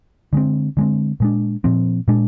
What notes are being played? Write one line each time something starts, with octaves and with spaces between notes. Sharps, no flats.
D3 G#3 C4
D3 G#3 C4
A#2 G#3 D4
A#2 F3 C4
A#2 G#3 D4